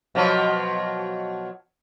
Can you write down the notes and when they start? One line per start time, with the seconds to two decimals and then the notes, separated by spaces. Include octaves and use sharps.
0.15 B2 F3 F#3